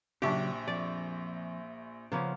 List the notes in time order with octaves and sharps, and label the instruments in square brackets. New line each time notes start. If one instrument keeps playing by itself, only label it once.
[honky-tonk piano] A#1 E5 C#6 [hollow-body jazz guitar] C#3 F#3 [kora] D4 G4
[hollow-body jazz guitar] F2 [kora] D5
[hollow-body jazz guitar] C#3 F3 C#4 [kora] A#3 B3